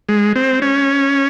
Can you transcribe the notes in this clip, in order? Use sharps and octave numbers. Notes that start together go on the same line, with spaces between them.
G#3
C4
C#4